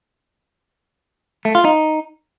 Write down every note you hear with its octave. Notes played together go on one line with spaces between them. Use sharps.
A3
F4
D#4